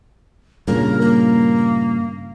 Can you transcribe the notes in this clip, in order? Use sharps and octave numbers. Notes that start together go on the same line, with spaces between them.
G2 A#2 C#3 A#4
A#3